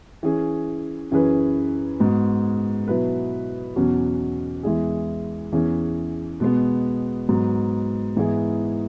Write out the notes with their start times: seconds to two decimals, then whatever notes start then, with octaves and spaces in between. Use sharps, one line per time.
0.23 E3 C#4 G#4
1.11 F#2 E3 C#4 G#4 B4
2.00 G#2 G#3 B3 F#4
2.88 B2 F#3 E4 B4
3.76 E2 B2 F#3 C#4 F#4
4.63 E2 E3 G#3 E4 G#4
5.52 E2 E3 C#4 G#4
6.40 B2 G#3 B3
7.29 G#2 F#3 B3
8.16 G#2 E3 B3 E4 G#4